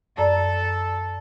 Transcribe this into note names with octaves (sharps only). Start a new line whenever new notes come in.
F#2 A4 D5 A#5